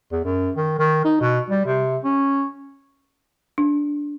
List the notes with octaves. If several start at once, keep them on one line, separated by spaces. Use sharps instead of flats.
E2
F#2
D#3
D#3
D#4
B2
G3
C3
C#4
D4